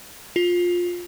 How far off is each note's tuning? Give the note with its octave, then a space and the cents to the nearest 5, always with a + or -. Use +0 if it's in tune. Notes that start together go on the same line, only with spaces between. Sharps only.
F4 +15